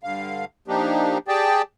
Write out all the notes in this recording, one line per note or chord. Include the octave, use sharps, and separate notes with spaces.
G2 D3 F5
F3 A#3 D4 D#4 G4
G4 G#4 D5 G5 A5